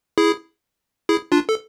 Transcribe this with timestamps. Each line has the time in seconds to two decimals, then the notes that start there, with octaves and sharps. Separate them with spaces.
0.18 E4 G#4
1.09 E4 G#4
1.32 D4 F4
1.49 A4